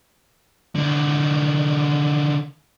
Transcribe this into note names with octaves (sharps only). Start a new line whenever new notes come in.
D3 D#3